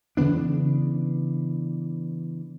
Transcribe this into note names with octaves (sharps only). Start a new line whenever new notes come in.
C#3 E3 B3 D4